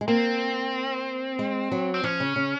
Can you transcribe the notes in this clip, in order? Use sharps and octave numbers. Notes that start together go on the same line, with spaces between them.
G#3
A#3 C4
G#3
F#3
C4
F3 C#4
C#3
C#3